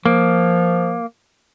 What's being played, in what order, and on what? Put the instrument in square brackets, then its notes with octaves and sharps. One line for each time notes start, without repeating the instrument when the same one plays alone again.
[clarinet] F3 [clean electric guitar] A#3